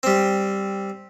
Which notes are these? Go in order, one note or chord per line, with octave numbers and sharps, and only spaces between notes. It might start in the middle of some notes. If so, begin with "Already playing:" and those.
G3 C4